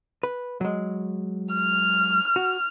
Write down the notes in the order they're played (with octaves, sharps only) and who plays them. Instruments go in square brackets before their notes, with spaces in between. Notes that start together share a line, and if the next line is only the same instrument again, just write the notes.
[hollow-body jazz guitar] B4
F#3 G#3
[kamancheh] F6
[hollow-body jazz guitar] F#4